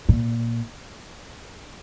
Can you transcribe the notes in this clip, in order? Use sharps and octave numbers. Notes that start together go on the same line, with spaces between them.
A#2